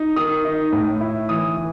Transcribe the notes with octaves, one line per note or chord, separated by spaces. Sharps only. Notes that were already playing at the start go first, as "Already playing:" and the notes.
Already playing: D#4
D#3 D#6
D#4
A2
E4
E3 D#6
E3